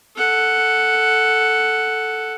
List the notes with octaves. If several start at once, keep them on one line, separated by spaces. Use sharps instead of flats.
A4 F#5